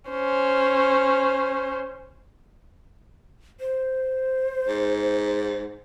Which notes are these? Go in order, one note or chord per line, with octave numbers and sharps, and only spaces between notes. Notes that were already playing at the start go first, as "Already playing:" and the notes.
C#4 C5
C5
G#2